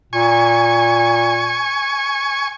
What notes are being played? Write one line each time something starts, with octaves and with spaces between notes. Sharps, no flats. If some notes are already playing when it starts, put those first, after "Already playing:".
A#2 G#5 C#6